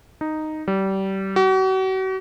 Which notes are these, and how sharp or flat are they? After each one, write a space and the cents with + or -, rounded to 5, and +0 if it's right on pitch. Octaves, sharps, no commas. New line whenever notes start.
D#4 -5
G3 -25
F#4 +40